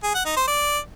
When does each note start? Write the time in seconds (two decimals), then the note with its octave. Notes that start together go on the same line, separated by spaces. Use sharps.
0.03 G#4
0.14 F#5
0.25 D#4
0.37 C5
0.48 D5